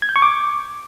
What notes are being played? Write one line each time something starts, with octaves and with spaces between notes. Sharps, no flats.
G#6
G6
C#6
D6